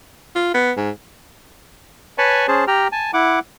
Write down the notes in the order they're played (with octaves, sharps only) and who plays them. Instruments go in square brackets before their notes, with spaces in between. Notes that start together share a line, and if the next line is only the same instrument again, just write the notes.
[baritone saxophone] F4
B3
G#2
[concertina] B4 C#5 G#5 A5 B5 C#6
C#4 G#4 C5 A5
G4 G5 A#5 F6
G#5 A5
E4 F#5 D6